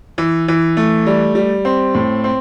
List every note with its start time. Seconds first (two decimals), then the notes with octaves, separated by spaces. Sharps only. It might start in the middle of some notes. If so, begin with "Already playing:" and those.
0.18 E3
0.48 E3
0.77 A3
1.07 G3
1.35 G3
1.65 C4
1.95 A2
2.24 C4